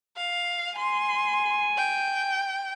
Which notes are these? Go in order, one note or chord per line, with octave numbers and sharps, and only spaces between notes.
F5
G#5 C6
G5